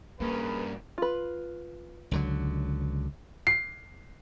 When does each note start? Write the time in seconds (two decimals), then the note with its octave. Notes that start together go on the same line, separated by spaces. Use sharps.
0.20 G2 A#3 C#4 G#4 A#4 B4
0.98 F4 B4
2.11 C#2 D3 F#3
3.47 C7